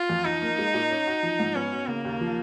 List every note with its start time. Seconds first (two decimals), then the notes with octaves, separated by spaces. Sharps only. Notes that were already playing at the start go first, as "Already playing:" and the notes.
Already playing: F4
0.10 F2
0.25 F3 D#4
0.42 A#3
0.58 G#3
0.74 A#2
0.90 C#4
1.07 F#4
1.23 F3
1.39 G#2
1.55 B3 C#4
1.72 F#4
1.88 C#3 A#3
2.05 D#2
2.21 F3